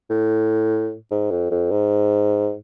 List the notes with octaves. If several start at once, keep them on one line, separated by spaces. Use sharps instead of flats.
A2
G#2
F2
F2
G#2